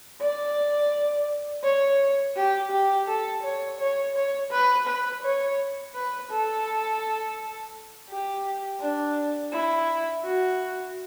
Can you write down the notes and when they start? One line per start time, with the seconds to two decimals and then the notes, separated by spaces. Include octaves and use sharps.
0.21 D5
1.64 C#5
2.36 G4
2.71 G4
3.08 A4
3.43 C#5
3.79 C#5
4.14 C#5
4.51 B4
4.87 B4
5.23 C#5
5.94 B4
6.31 A4
8.09 G4
8.81 D4
9.52 E4
10.24 F#4